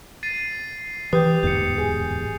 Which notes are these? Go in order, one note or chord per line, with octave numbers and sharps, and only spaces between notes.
A6 C7 D#7
E3 G4 B4 D#6 G6
D1 E2 G#2 G6 C#7
G#4